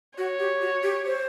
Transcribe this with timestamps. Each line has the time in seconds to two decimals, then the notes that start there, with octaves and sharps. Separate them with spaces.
0.18 F#4 C#5
0.39 G4
0.62 F#4
0.83 G4
1.06 C5